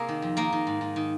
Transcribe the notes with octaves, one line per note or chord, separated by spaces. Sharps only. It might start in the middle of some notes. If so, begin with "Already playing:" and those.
Already playing: C3 A#3 G#4 A#4
D#3
F2
D#3 A#3 A#4
D#3
G#2
G#2
D#3